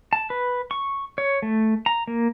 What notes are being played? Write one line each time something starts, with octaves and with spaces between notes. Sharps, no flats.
A5
B4
C#6
C#5
A3
A#5
A#3